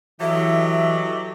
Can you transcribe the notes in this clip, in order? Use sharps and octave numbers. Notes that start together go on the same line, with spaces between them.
E3 F#3 G4 A4 D#5 E5